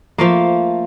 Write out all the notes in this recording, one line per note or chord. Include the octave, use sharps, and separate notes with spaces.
F3 A3 A#3